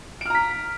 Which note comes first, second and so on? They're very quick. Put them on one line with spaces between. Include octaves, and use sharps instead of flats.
D7 F6 A#5 B6